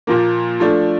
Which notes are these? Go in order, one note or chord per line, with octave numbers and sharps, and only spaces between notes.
A#2 F3 A#3
F3 A3 D4